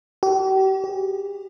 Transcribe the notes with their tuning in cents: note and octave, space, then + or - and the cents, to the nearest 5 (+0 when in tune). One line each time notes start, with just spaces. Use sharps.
G4 -40
G4 +40